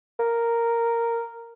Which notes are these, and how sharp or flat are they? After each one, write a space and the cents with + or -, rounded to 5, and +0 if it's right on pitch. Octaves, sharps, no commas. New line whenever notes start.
A#4 -5